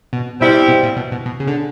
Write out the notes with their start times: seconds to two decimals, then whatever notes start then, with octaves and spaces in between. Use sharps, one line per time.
0.13 B2
0.41 B2 G3 C4 E4
0.68 B2
0.83 A#2
0.96 B2
1.12 B2
1.26 B2
1.40 C#3
1.47 D3